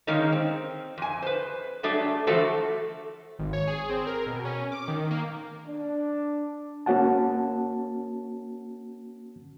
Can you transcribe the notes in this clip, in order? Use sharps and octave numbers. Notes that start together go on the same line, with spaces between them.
D#3 G#3 A#3 C#4 D#4
C4
F2 G#5
B4 C5
F#3 G3 A3 D4 G#4
E3 F3 A3 F#4 A4 C5
G#1
C#5
G#4
C4
A#4
B2
C#4
D6
D#3
A#3
D4
A#3 C#4 F#4 F#5 A5